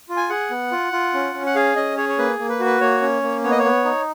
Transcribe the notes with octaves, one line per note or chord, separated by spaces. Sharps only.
F4
G#5
G#4 F#5
B3
F4
F4
C#4
C#4
F#5
G#4 F5
C#4 D#5
G#4 C#5
C#5
A#3 B4
A#3
B4
F#4
B4
A#3 C#5
C#4
A#3
B3 C#5
D#5
C#5
B3
D#4